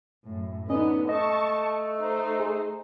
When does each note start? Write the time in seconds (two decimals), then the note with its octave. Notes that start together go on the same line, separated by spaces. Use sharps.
0.24 F#2 A2
0.70 D3 B3 C#4 D#4 D#5
1.09 A3 D#5 A5 C#6
2.00 D#4 C5
2.40 G#4